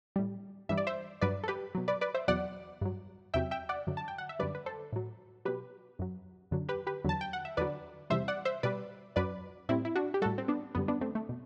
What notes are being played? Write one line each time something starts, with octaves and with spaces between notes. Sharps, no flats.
A2 G3
G2 E3 G3 E5
D5
C5 E5
G2 F#3 B4 D5
A4
G4 B4
B2 F#3
B4 D5
B4 D5
C5 E5
E2 B2 F#3 D5 F#5
G2 F#3
E2 C3 F#3 E5 G5
E5 G5
D5 F#5
F#2 D3 F#3
A5
G5
F#5
E5
F#2 D3 G3 B4 D5
B4
A4 C5
A2 F#3
B2 F#3 G4 B4
F#2 F#3
F#2 D3 F#3
G4 B4
G4 B4
E2 D3 F#3 A5
G5
F#5
E5
E2 D3 F#3 B4 D5
E2 C3 E3 G3 C5 E5
D5 F#5
C5 E5
B2 G3 B4 D5
F#2 F#3 B4 D5
A2 G3 C4 E4
E4
D4 F#4
G4
A2 G3 F#4 A4
C4
B3 D4
F#2 D3 G3 B3
B3 D4
A3 C4
A3
B2